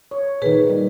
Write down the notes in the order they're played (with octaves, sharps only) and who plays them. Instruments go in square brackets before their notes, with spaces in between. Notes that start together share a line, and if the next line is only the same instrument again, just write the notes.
[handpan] C#5
[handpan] A#2 D#3 [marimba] G#4 B4
[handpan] D#3 G3